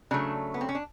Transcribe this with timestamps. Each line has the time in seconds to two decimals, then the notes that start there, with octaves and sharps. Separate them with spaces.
0.11 C#3 F#3 A3 D4
0.54 B3
0.61 C4
0.69 C#4
0.75 D4